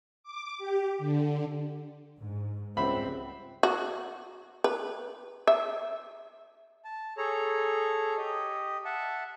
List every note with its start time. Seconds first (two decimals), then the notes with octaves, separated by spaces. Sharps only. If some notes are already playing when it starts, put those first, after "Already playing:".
0.23 D6
0.58 G4
0.99 D3
2.19 G#2
2.77 C#2 G#2 G3 C4 C5 E5 F#5 B5
3.63 F#4
4.64 B4
5.47 E5
6.85 A5
7.17 G#4 A4 C#5 A#5
8.18 G4 D#5
8.85 E5 F#5 A5